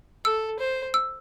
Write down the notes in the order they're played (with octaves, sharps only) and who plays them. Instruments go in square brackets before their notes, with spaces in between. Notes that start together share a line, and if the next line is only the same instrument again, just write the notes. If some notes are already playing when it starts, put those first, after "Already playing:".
[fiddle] A4 [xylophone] E6
[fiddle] C5
[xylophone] E6